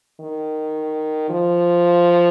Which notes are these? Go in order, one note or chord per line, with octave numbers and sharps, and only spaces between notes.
D#3
F3